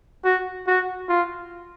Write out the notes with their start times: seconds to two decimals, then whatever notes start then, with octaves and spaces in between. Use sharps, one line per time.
0.25 F#4
0.67 F#4
1.09 F4